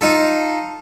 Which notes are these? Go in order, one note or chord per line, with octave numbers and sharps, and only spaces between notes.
D#4 F4 A4